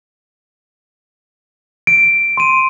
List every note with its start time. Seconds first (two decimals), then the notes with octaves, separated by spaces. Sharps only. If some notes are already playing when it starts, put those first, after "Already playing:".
1.87 D7
2.37 C6 D#7